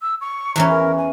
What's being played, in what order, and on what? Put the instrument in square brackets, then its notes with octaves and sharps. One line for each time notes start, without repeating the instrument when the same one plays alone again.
[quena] E6
C#6
[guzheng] E2 E3 C#4 [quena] A#5
[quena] A#4
G#5